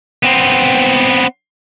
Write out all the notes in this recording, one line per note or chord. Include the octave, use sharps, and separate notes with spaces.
B3 C4